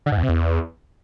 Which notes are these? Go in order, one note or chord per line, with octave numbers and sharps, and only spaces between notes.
D3
G#2
E2
C3
E2